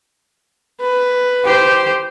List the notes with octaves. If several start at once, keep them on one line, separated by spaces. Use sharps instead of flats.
B4
G4 C5